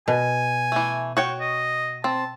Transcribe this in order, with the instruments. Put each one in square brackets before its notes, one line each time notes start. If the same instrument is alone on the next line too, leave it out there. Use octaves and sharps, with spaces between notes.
[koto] B2 [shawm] G#5
[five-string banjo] E3 A3
F#4 C#5 G5
[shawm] D#5
[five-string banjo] C4 [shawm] A5